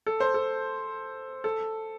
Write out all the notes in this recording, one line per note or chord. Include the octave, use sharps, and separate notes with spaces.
A4
C5
A4
A4